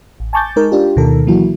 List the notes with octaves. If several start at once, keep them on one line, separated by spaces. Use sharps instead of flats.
A1
G#5 A5 C#6 D6 G6 A6
G#3 D#4 A#4
D4 F4 G4
D2 B2 D#3 D#4 A4 A#4
E3 F#3 A#3 E4 F#4